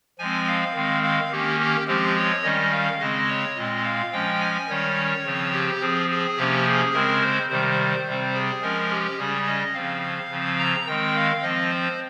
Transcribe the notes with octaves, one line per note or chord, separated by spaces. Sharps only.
F3 G#3 C4 G#5
F5
D#3 G#3 C4
F5
D#3 A#3 C#4 G4
G4
F3 G#3 C4 G4
C#5
D#3 G3 C#4 D#5
F5
C#3 G#3 C4 D#5
C#5
A#2 G#3 C4 D#5
F5
F3 G#3 C#4 G5
G#5
D#3 G3 C#4 C#5
C#3 F3 C4
G4
F3 C4 G#4
G#4
C3 F3 A#3 C#4 G4
G#4
C#3 G#3 C4 A#4
C5
C3 D#3 G3 C5
C3 G3 C4
G#4
F3 G#3 C#4 A#4
G4
C#3 G3 C#4 G#4
D#5
C#3 F3 C4 F5
C#3 F3 C4
A#5
D#3 G#3 C4 G5
F5
F3 C4 D#5
C5